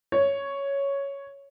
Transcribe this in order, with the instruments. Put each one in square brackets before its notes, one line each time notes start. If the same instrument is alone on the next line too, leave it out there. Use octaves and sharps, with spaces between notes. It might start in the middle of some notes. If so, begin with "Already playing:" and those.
[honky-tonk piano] C#5